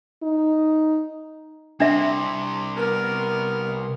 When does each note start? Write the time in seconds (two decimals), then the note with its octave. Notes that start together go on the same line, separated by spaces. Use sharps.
0.23 D#4
1.80 C2 C3 D4 E5
2.77 B3 A#4